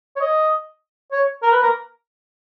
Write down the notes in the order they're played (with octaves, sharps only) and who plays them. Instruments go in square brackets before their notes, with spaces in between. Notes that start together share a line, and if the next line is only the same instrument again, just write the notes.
[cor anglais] C#5
D#5
C#5
A#4
B4
A#4